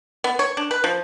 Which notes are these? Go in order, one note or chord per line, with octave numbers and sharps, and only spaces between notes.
B3
C#5
D4
B4
F3